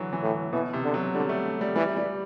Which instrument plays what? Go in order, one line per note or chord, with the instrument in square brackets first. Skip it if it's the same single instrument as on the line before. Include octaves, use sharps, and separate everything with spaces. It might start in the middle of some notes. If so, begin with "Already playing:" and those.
Already playing: [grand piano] D3 E3 F#3
E3
[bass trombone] A2
[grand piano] B2 [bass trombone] E3
[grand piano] C3
[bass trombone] D3
[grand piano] F#3
[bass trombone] D3 [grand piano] G3
[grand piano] A3
G3
[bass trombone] E3 [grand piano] G3
[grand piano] G3